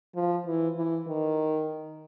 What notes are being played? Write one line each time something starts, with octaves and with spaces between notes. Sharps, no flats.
F3
E3
E3
D#3